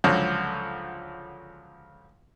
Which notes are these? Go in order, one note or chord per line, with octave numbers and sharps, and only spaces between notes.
C#2 D3 F3 F#3